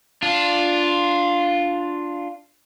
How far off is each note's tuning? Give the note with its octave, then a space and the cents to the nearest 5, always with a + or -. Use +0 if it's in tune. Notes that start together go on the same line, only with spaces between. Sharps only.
D4 +0 F4 +0